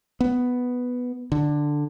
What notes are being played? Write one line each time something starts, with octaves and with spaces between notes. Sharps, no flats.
B3
D3